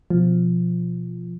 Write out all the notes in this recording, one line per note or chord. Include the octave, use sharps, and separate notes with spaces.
B2 F3